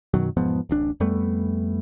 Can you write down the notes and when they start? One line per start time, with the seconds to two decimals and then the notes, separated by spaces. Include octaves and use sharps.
0.14 F#2 B2 D#3 F#3
0.37 E1 G#2 F3 B3
0.69 D1 A1 D4
1.00 F2 G3 A3 B3